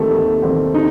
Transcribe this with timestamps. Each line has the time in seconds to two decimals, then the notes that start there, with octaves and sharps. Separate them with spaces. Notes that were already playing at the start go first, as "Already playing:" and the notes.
Already playing: D#2 D#3 G3 A3 C4 G4
0.10 D#2
0.42 D#3 G3 C4 G4
0.74 D#4